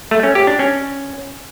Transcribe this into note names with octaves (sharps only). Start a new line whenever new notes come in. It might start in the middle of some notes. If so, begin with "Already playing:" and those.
A3
C#4
G4
D4
C#4